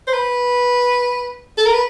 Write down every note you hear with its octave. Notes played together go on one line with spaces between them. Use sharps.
C5
B4
A4
A#4
B4